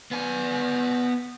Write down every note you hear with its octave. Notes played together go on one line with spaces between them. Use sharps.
B3 G#5